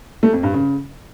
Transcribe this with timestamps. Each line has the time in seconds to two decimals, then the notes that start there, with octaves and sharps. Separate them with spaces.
0.23 A3
0.33 F2
0.43 G2
0.54 C#3